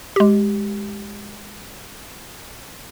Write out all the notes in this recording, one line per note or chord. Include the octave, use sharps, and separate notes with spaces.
G#3 G4